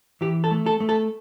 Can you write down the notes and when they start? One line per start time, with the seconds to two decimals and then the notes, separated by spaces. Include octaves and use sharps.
0.21 E3 G4
0.44 A4
0.51 A3
0.66 A4
0.80 A3
0.89 A4